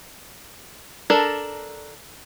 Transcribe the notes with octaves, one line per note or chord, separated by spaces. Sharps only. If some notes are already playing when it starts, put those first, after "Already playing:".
D4 A4 A#4